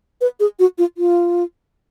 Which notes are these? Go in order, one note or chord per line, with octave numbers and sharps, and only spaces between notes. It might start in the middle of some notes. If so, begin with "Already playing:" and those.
B4
G#4
F#4
F4
F4